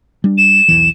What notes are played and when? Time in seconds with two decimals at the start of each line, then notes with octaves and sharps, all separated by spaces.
0.24 G3 D4
0.38 E7
0.68 B1 E2 E3